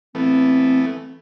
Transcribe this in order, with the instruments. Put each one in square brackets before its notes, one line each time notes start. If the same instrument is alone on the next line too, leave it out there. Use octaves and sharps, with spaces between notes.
[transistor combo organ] E3 A3 B3 [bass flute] C4